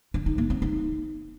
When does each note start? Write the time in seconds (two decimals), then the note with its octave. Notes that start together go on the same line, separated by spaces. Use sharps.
0.14 D4
0.26 D#4
0.38 A#3
0.50 C4
0.62 D#4